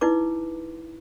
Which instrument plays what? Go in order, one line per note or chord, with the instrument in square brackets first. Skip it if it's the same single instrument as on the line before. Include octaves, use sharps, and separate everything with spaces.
[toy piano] D#4 E4 B4 D6